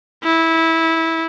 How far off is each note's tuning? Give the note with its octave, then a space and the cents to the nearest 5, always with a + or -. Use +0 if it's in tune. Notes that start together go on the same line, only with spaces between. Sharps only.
E4 -15